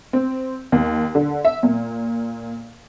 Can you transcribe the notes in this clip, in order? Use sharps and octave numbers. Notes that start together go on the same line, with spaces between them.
C4
D#2
D3
E5
A#2